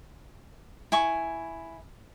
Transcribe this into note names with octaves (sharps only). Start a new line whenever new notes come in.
E4 G#5 C#6